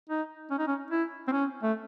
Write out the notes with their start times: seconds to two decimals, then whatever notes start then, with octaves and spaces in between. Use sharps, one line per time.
0.10 D#4
0.51 C#4
0.59 D#4
0.67 C#4
0.91 E4
1.28 C4
1.32 C#4
1.63 A3